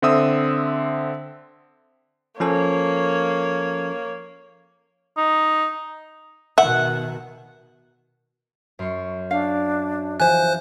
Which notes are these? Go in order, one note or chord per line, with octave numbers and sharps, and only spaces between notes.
D3 C4 E5 D#6 E6
F3 A#3 C#4 A4 C#5
D#4
B2 D#3 E5 F#5
F#2 C6 C#6
D4 F5
E3 F3 C5 G#5 F#6